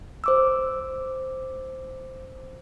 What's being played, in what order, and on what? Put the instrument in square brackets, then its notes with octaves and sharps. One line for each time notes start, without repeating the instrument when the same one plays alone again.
[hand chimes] C5 D6 E6